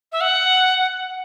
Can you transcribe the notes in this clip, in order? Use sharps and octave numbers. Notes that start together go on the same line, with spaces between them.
E5
F#5